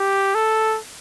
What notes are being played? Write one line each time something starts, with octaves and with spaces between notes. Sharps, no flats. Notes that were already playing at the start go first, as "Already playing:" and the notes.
Already playing: G4
A4